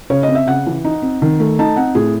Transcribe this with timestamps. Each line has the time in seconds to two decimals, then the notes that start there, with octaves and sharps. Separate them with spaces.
0.10 C#3 C#5
0.23 D#5
0.28 C4
0.35 E5
0.47 C#3 F#5
0.66 E3
0.84 D#4
1.02 C4
1.22 D#3
1.40 A3
1.59 D#4 A5
1.76 C4 F#5
1.95 A2 G#4